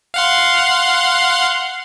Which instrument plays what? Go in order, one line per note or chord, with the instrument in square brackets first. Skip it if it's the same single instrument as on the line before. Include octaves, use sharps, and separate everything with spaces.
[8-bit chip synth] F5 F#5 C6